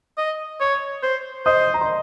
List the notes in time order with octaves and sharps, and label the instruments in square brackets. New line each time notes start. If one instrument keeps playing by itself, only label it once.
[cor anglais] D#5
C#5
C5
[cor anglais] C5 [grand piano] D#5 D#6
[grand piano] A#5
C6